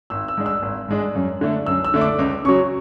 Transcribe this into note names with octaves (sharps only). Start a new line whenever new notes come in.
G#1 E6
E6
G#2 G#3 D4
E6
G#1
G#2 G#3 D4
F#2
D3 A3 D4
F#2 E6
E6
D3 A3 D4
D6
C#2 D6
C#3 F#3 C#6